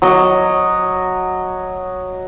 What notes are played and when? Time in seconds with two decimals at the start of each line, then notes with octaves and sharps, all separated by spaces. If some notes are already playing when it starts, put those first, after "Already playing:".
0.02 F#3 D#5